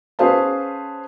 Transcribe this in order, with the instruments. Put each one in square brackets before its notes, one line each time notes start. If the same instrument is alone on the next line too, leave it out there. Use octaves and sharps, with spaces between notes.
[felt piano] C#4 G#4 B4 C5 F5 A5